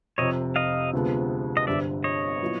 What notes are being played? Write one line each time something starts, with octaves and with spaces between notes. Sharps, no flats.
F1 F2 C3 C#5 D#5
D#5 F5
D2 C3 F3 G#3 B3
D#5
G1 G2 D3 G3 C4 D5 E5
C#5 D#5
A#2 F#3 B3 E4